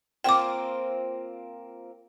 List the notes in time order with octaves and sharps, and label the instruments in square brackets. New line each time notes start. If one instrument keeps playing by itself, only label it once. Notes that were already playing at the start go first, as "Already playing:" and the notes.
[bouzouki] A#3 C4 F4 [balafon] G5 D6